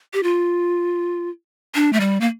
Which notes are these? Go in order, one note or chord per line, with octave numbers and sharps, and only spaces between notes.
G4
F4
D4
A3
G3
A#3